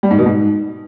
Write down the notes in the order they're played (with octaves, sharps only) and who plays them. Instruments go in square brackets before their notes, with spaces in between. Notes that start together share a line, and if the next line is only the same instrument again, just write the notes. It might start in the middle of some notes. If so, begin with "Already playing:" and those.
[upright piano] G3
G#2
B2
G#2